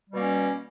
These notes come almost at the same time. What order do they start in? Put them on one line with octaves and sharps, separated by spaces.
G3 B2 A#3 C#4